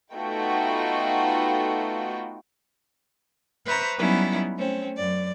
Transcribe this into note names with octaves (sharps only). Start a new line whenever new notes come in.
A3 B3 D#4 F4 F#4 G5
B4 C5 E5 A#5 C#6 G6
F#3 G3 B3 C#4 D#4 E4
A3 C4 C#4
F#2 D5